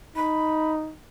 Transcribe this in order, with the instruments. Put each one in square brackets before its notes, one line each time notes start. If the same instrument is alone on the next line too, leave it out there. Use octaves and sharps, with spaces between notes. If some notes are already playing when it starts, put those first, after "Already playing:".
[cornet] D#4 [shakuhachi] B5